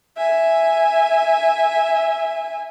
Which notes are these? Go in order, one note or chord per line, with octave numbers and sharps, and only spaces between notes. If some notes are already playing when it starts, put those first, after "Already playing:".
E5 G#5